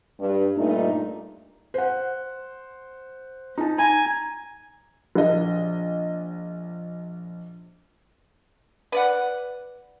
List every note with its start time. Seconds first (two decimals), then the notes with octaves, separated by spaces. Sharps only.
0.19 G2
0.56 G2 A#2 A3 D#4
1.74 C5 F#5
3.58 D#4 A5
3.78 G#5 A#5
5.15 A#1 D#5
8.92 B4 D5 F#5